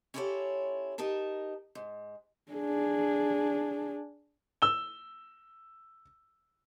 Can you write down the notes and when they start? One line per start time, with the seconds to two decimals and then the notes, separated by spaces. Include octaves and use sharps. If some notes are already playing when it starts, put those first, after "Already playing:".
0.14 C#4 E4 F4 G4 A4 C#5
0.98 D#4 G4 A#4 A5
1.75 G#2
2.52 D4 G#4
4.62 E6 G7